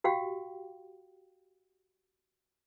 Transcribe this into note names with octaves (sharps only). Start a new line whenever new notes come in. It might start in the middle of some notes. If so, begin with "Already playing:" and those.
F#4 G4 F5 G5